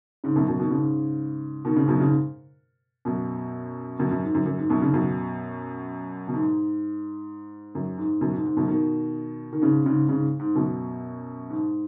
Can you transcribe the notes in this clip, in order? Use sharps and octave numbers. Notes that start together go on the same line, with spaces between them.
G#2 C#3
F#2 B2
F#2 B2
B2 D#3
G#2 C#3
B2 D#3
G#2 C#3
F#2 B2
G#2 C#3
F#2 B2
F#2 B2
F#2
G#2
F#2
F#2
G#2
F#2 B2
G#2 C#3
F#2 B2
B2
G#2
F#2
G#2
F#2 B2
G#2
G#2
F#2 B2
B2 D#3
D#3
G#2 C#3
G#2 C#3
G#2 C#3
G#2
F#2 B2
G#2